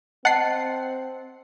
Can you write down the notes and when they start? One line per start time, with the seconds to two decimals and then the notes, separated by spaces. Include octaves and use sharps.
0.25 C4 D#5 F#5 A5 C7